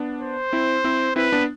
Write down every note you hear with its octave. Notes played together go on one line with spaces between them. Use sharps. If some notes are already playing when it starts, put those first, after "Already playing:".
Already playing: B3 D4
C5
C4 E4
C4 E4
C4 E4 B4
B3 D4